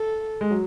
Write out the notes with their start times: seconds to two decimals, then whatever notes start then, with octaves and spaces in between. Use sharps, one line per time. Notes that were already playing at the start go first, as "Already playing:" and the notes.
Already playing: A4
0.41 G#3
0.51 F#3